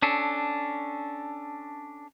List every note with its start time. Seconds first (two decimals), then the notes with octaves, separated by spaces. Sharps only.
0.02 C#4 D4 A4